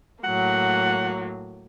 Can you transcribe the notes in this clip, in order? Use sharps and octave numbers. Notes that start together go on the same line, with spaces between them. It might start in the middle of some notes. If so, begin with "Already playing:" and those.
A2 F#3 A#3 F#5